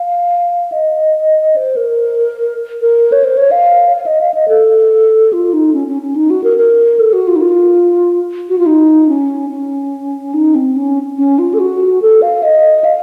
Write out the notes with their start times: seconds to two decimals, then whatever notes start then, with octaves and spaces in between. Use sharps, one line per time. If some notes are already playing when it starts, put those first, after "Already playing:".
Already playing: F5
0.72 D#5
1.56 C5
1.76 A#4
2.81 A#4
3.12 C#5
3.24 C5
3.37 C#5
3.51 F5
3.97 F5
4.06 D#5
4.21 F5
4.34 D#5
4.48 A4
5.33 F4
5.53 D#4
5.74 C#4
5.88 C#4
6.02 C#4
6.16 D#4
6.30 F#4
6.44 A#4
6.58 A#4
7.00 A4
7.13 F#4
7.27 F4
7.36 D#4
7.41 F4
8.49 F#4
8.58 F4
8.66 D#4
9.09 C#4
9.50 C#4
10.34 D#4
10.55 C4
10.76 C#4
11.17 C#4
11.39 F4
11.54 A4
11.59 F#4
12.02 A4
12.22 F5
12.43 D#5
12.84 F5